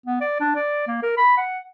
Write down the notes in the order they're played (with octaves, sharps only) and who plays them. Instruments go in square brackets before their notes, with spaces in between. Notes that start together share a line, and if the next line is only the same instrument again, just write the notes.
[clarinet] B3
D5
D4
D5
A#3
A#4
B5
F#5